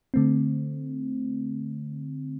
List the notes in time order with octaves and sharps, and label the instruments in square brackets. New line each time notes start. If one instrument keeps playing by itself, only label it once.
[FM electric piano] D3 A3 C4